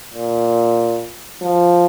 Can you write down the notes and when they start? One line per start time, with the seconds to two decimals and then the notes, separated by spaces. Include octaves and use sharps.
0.13 A#2
1.42 F3